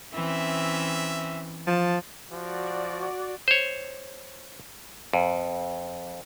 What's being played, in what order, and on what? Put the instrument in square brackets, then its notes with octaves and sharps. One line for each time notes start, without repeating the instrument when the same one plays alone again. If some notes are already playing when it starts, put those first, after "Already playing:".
[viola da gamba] E3 C4 C#4 [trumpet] E5
[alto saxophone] F3 [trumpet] A5
[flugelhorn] F3 [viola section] F#4 D5
[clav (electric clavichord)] C5 C#5
F2